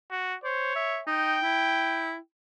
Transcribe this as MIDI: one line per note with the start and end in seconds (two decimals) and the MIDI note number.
0.11 0.35 66
0.44 0.73 72
0.44 1.01 73
0.76 1.00 76
1.07 1.37 63
1.07 2.21 79
1.43 2.16 64